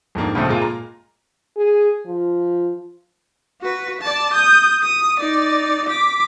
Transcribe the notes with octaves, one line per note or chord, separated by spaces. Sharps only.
F2 G#2 A#3 D4
C#2 G2 A#2 F3 A3 C4
A#2 G#3 A#3 F4
A#5
G#4
F3
F#4 B4
D5 A5
D#6 G6
D#6
D#4 D5
D6 B6